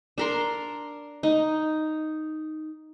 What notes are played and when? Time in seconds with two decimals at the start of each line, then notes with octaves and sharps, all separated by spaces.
0.18 D4 A#4 C6
1.23 D#4